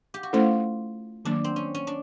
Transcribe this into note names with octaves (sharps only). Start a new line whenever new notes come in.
G4
F#4
A3 C#4 E4 F4 A4 C5
D#3 F#3 A#3 D4
C4
C#4
C#4
D4